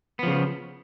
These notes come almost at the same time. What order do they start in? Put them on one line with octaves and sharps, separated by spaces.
B3 F3 C#3